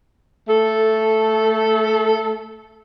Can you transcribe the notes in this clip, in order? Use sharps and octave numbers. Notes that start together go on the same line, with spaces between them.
A3 A4